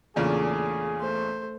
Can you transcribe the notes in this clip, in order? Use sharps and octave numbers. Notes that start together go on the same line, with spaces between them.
E2 A#2 C#3 A3 D4 G#4
A3 C5